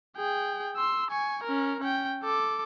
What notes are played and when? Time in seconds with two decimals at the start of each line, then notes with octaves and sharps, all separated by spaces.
0.17 G#4 G5
0.76 C6 E6
1.10 G#5 C#6
1.43 C#4 A#4
1.81 C#4 G5
2.23 A4 D6